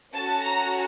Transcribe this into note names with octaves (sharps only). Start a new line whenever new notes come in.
C#4 F#4 A4 A5
A#5